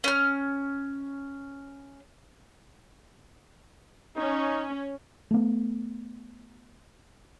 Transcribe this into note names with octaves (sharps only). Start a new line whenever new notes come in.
C#4 F6
C#4 D#4
A3 B3